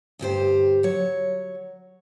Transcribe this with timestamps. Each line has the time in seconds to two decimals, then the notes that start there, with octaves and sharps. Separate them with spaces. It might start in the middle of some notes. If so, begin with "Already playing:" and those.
0.19 D2 G2 G4 C5
0.83 F#3 C#5